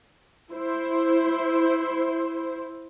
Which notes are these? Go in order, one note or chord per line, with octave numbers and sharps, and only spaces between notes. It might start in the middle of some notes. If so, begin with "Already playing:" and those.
E4 C5